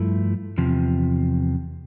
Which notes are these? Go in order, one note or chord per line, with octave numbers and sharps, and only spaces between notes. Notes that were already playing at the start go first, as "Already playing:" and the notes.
Already playing: G2 F3 A3 E4
E2 C3 F3